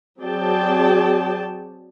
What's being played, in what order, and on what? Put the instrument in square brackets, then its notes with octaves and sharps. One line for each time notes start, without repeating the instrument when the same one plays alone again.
[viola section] F#3 C4 G#4 D5 G5 A5